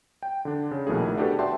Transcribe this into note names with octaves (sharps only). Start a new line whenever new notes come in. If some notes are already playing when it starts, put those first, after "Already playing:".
G5
D3 D4
C#3
A#1 B2 D#3 A3 E4 G#4
D4 F#4 G4 A4 B4
F#4 D5 E5 G5 A5 C6